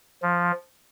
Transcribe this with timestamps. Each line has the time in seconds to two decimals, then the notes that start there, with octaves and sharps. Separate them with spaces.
0.22 F3